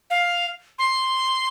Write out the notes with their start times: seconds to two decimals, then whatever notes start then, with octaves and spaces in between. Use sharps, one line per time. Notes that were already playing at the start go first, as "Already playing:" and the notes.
0.10 F5
0.79 C6